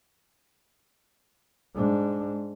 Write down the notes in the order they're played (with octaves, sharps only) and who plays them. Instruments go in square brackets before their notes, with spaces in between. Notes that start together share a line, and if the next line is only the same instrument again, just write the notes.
[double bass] G#2 D4